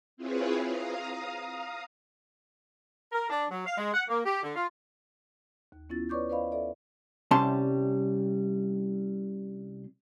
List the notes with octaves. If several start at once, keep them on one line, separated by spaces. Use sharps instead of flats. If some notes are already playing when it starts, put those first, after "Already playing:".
C4 E4 F4 G#4 B4 C#5
F5 A#5 D#6
A#4
D4
F#3
F5
G#3
F#5
A#3
G4
D3
F4
D#2
B3 C#4 E4 F4 A6
B4 C#5 D5 C#6 D6 G6
B4 C5 D5 D#5 F5 B5
A4 D5 E5
C2 C3 G3 C#4 A5 C6